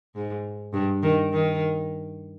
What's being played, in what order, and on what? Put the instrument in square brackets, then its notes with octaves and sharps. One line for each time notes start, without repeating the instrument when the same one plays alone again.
[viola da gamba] G#2
G2
D#3
D#3